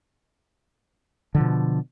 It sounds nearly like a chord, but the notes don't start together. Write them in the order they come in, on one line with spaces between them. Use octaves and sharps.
D3 F3 B2